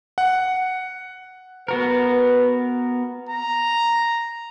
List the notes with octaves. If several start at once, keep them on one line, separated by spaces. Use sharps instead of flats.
F#5
B3 F#4 A#4 B4
A#5